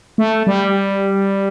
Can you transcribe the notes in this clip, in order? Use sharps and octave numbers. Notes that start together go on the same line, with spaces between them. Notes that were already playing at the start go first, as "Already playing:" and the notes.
A3
G3